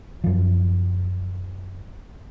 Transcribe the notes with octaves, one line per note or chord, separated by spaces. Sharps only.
F#2 F3